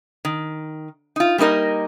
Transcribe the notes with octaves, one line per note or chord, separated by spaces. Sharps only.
D#3
D#4 F4
G3 A#3 D#4 A#4 D#5